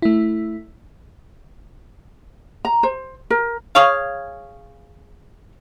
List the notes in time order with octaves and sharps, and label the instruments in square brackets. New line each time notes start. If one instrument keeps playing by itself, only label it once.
[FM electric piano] A3 E4
[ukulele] A#5
C5
A#4
[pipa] G#4 C#5 F5